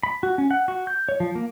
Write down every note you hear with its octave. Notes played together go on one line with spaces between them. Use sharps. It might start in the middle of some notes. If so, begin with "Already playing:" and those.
B5
F#4
C#4
F#5
F#4
G6
C#5
F3
A#3